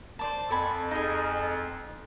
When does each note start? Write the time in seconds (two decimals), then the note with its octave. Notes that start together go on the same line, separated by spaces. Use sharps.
0.19 C5 D5 A5
0.50 F2 A4 G#5 B5
0.91 D#4 G#4 G#5